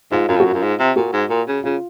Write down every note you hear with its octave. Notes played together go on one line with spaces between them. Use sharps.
G#2 F4
F#2 F4
F2
F#2 F#4
F#2 F4
G#2
C3
A#2 F#4
G#2
A#2
C#3
C#3 F4